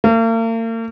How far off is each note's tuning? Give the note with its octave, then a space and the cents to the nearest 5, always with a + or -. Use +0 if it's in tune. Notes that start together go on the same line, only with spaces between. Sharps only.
A#3 -45